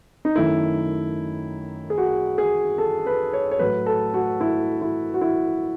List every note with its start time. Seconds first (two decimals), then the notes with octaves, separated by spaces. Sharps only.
0.25 D#4
0.36 F#2 D#3 A3 E4
1.90 G#4
1.98 F#4
2.38 G#4
2.78 A4
3.06 B4
3.33 C#5
3.51 C#5
3.59 A2 F#3 A3 B4
3.86 A4
4.14 F#4
4.40 E4
4.81 E4
5.14 F#4
5.21 E4